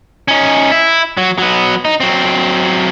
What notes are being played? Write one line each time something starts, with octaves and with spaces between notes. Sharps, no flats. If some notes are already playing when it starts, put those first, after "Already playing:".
C#4 D#4
E4
F#3
F#3 B3
D#4
F#3 C4